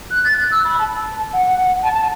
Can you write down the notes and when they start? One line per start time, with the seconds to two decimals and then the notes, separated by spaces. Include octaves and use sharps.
0.11 F#6
0.24 A6
0.37 F#6
0.51 E6
0.65 B5
0.79 A5
1.33 F#5
1.46 F#5
1.60 F#5
1.83 A5
1.93 A5